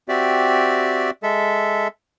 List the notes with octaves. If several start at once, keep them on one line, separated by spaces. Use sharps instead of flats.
C4 F#4 G4 D5 E5
G#3 A4 E5